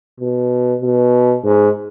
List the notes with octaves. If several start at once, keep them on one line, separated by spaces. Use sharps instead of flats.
B2
B2
G#2